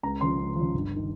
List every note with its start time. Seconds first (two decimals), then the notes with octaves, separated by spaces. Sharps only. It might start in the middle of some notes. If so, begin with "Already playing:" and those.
0.03 C#2 A#5
0.21 C#3 F3 C6
0.38 C#2
0.56 F3
0.61 C#3
0.74 G1
0.96 D#3